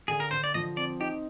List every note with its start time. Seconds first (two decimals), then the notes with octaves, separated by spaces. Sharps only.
0.08 D3 G#4
0.20 A#4
0.31 D3 C5
0.44 D5
0.54 F3 D#5
0.77 C4 D5
1.00 D#4 G4